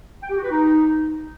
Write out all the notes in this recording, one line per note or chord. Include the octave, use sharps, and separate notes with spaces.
G5
G4
F#4
B4
D#4